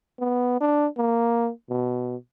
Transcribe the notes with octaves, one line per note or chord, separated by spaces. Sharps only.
B3
D4
A#3
B2